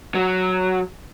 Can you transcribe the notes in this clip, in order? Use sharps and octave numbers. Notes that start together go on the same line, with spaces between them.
F#3